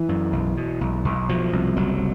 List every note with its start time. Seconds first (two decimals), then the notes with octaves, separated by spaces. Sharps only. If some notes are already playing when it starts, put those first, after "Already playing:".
Already playing: E3
0.09 F#2
0.33 B1
0.57 B2
0.81 B1
1.05 B1
1.29 B2 F3
1.53 C2
1.77 F#1 F#3